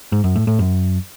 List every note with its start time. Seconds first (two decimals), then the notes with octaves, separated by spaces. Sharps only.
0.12 G#2
0.24 F#2
0.36 A2
0.47 A2
0.59 F#2